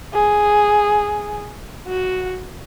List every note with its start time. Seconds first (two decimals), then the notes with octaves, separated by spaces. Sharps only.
0.14 G#4
1.87 F#4